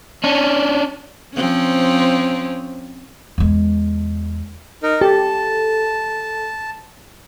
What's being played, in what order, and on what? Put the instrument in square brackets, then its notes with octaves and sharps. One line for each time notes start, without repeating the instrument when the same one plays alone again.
[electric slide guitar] C#4 D4
[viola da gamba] F3 C4 C#4
[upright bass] E2 G#3
[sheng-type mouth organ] D#4 A#4
[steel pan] G4 [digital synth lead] A4 [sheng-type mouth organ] A5